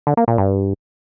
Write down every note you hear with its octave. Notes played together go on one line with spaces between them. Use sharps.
D3
A#3
A#2
G2